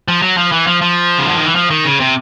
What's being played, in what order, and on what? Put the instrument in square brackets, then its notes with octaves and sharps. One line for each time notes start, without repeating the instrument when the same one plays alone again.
[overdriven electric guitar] F3
F#3
F3
E3
F3
F3
C#3
D3
D#3
E3
F3
D#3
C#3
C3